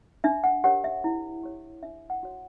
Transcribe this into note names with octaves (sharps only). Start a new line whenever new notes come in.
D4 E5
F#5
G4 A#4 C#5 F#5
E5
E4
G4 C#5
D4 E5
F#5
F#4 C#5